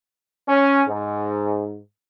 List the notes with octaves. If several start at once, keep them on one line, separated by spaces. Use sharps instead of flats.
C#4
G#2